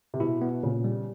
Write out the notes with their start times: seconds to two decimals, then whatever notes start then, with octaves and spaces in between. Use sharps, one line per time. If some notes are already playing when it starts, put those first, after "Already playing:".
0.14 C3
0.20 B2 E4
0.41 B3
0.63 A#2 C#3
0.84 G3